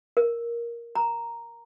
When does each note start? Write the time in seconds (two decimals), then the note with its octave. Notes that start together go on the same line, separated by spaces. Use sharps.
0.17 A#4
0.95 A#5